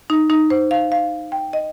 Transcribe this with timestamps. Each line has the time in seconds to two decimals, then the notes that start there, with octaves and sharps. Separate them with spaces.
0.10 D#4
0.30 D#4
0.50 C5
0.71 F5
0.92 F5
1.32 G5
1.53 D#5